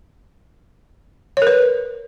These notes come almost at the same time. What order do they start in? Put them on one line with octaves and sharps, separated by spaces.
C#5 A#4 B4